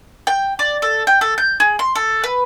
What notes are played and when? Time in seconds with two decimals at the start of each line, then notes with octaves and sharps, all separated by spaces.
0.27 G5
0.59 D5
0.82 A4
1.07 G5
1.21 A4
1.38 G6
1.60 G#4
1.79 C6
1.95 A4
2.24 B4